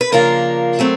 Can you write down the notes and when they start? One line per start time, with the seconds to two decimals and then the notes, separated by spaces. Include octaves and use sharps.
0.01 B4
0.12 C#3 F3 A#3 D4 F4 A#4
0.79 F#3 A3 C4